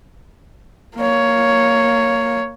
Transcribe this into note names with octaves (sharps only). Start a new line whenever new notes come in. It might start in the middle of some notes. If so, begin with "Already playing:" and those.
A#3 C#5